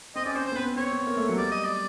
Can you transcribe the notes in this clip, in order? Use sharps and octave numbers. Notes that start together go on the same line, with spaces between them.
C4 D#5
C#4 D5
C4 C5
C5
B3
C4 B4
C4 C#5
B3
A#3
A3
F#3
G3 D5
D#5
D5